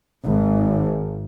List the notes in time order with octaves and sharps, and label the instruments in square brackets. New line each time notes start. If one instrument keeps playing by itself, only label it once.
[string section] G#1